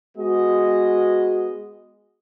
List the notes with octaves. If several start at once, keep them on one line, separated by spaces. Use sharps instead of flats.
G#3 B3 F#4 D#5